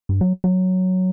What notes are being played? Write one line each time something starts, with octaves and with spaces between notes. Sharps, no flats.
G2
F#3
F#3